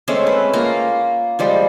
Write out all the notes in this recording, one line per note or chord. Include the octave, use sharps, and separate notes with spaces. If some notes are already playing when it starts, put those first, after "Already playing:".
G#3 A3 C4 C#4
B4
A#3 F4 F5 A#5
F3 G3 G#3